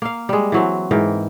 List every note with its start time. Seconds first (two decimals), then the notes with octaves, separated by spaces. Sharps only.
0.02 A#3 F5
0.29 G3 G#3
0.52 E3 F#3 C4
0.91 G#2 E3 A#4 G5